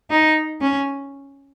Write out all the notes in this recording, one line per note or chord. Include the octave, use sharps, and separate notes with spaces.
D#4
C#4